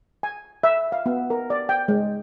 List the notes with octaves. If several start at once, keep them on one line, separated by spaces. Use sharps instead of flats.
G#5
E5
F5
B3
A#4
D5
G5
G#3